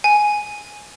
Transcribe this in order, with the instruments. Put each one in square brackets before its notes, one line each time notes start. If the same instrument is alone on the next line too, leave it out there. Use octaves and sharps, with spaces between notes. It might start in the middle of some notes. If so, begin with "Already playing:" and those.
[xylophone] G#5